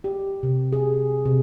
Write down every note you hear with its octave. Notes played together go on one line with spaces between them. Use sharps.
G4
C3
G#4
C3